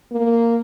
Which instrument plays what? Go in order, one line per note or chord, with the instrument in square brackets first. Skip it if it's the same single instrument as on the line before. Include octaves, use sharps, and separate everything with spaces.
[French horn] A#3